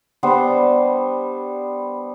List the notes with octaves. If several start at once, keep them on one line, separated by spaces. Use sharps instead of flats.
G3 B3 D4 C5